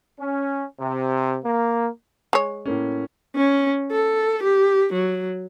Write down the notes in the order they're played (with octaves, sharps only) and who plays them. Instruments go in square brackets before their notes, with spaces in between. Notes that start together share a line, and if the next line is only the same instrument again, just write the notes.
[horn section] C#4
C3
A#3
[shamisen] G#3 C#5
[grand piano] A2 A#3 C#4
[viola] C#4
A4
G4
F#3